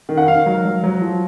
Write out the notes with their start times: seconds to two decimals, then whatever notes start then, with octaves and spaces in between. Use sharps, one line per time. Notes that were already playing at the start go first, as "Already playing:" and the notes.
0.09 D#3
0.17 F#5
0.28 D#3 F5
0.46 F#3
0.65 F#3
0.83 F#3
1.02 F3